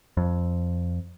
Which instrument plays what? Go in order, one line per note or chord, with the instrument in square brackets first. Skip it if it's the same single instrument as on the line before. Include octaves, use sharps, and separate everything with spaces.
[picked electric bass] F2